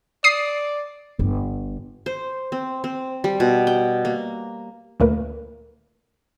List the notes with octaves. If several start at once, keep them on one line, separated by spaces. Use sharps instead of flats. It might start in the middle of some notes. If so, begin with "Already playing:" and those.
D5 D#6 C7
G1
C5
C4
C4
G3
B2
G5
A#3
D2 A#2 A3 A#3 A#4 B4